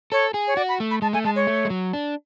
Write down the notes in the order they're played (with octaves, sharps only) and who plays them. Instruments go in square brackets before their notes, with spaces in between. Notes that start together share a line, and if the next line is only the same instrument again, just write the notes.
[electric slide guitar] A4 [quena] C#5
[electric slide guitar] G#4
[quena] C#5
[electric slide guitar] F#4 [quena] D5
[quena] B5
[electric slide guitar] A3
[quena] B5
[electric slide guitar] G#3 [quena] A5
[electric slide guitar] A3 [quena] G#5
[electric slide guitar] G#3 [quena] A5
[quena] C#5
[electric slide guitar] A3
G#3
F#3
D4